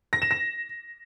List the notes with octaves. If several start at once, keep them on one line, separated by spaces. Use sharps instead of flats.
A#6
E7
A#6